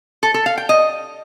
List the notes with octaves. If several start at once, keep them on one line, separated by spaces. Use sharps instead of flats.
A4
A4
F5
G5
D#5